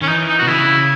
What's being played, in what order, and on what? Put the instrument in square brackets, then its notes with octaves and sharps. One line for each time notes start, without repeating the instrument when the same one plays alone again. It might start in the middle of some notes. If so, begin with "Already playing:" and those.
[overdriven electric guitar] D#3 [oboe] C#4
[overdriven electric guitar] E3 [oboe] D#4
[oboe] D#4
[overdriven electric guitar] B2 [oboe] F#4
[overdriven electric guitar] C#3 [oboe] E4